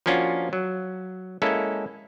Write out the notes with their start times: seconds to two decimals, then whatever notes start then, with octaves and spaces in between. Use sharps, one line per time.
0.06 F3 A#3 C#4 D4 F4 F#4
0.53 F#3
1.42 G#3 A#3 C#4 E4 A4